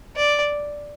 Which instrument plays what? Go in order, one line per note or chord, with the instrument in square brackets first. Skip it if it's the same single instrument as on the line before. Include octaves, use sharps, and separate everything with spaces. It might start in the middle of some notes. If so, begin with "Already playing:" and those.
[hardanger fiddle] D5